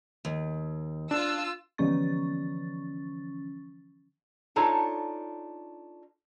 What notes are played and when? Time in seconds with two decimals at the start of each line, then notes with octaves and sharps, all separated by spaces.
0.25 D#2
1.11 D4 F4 E6
1.78 D3 E3 F3 C#4 C#6 A6
4.56 D4 D#4 F4 A4 C#5